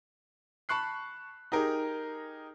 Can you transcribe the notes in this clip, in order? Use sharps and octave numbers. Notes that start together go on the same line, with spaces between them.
A5 B5 C#6 F#6 C7
D#4 G4 G#4 A#4